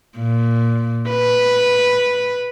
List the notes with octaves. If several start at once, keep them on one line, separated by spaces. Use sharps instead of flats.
A#2
B4